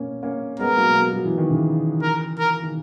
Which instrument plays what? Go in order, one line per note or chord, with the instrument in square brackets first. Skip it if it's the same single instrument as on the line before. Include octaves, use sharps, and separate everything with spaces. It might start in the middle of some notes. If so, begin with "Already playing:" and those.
Already playing: [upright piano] A#3 C#4
A#3 C#4
[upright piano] G#3 B3 [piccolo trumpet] A#4
[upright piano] F#3 A#3
F#3 A#3
F#3
E3
D#3
C#3 E3
[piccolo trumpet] A#4
A#4
[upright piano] D#3